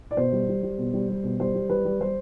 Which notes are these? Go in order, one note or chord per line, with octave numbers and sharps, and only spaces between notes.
D5
B2 C5
G3
G3
G3
B2
G3
G3
B2
G3 C5
G3
G3 B4
G3
G3 C5